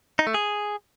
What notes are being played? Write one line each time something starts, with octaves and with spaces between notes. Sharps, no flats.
D#4
A3
G#4